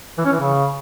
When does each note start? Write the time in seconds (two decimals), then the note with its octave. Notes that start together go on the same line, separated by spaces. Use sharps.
0.18 E3
0.25 C#4
0.32 E3
0.40 C#3